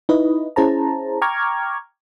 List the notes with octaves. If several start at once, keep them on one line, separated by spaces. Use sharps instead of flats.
D#4 E4 B4 D#5
C#4 E4 G#4 C5 A5 A#5
G5 A#5 C#6 D6 F6 G#6